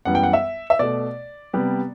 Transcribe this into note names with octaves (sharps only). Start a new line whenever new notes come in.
F#2 E3 G3 B3 F#5
G5
F#5
E5
E5
B2 A3 D5
C3 G3 B3